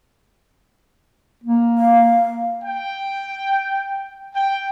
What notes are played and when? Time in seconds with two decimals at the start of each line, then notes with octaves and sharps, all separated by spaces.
1.43 A#3
1.78 F5
2.63 G5
4.35 G5